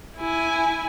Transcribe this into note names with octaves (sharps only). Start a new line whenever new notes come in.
E4 G#5